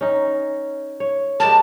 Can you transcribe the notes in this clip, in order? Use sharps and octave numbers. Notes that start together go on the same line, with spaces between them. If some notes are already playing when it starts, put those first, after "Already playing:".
C#4 D#4
C#5
G#3 G4 A#4 A5